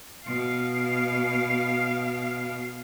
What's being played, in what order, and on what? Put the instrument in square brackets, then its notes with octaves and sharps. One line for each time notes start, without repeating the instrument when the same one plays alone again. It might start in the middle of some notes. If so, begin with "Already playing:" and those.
[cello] B2 F5